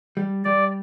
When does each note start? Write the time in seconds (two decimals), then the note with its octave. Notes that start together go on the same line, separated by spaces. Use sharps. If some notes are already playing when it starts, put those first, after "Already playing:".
0.17 G3
0.45 G3 D5